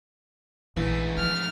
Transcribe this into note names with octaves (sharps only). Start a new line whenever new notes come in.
A#1 G#2 E3 A3
F3 F6